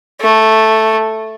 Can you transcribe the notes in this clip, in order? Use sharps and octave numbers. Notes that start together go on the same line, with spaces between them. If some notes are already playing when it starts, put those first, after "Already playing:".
A3